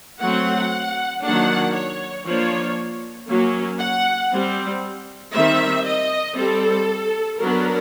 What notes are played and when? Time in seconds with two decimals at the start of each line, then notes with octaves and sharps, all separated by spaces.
0.20 F#3 A3 C4 F#5
1.23 D#3 F#3 A#3 D4 F#5
1.74 C#5
2.25 F3 A#3 D4 C#5
3.28 F#3 A#3 C#4
3.79 F#5
4.31 G3 C4
5.33 D#3 G3 C4 E5
5.85 D#5
6.36 G3 C4 A4
7.39 F#3 B3 D4 A#4